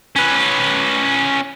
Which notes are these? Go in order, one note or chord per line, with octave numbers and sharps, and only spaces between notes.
C#4 B4